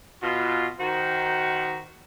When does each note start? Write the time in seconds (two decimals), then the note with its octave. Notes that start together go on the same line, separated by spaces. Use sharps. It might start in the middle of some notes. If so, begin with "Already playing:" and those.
0.22 B2 F4
0.80 D#3 F#4 C5